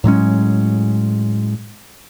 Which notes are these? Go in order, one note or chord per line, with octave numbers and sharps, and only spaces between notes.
A2 F#3 G#3 C#4